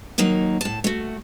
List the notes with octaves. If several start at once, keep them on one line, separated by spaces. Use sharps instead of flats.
D#2 F#3 A#3 D#4
A2 A5
A3 F#4